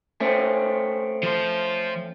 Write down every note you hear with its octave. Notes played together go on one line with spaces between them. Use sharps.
A3 C4 C#4
F3 C5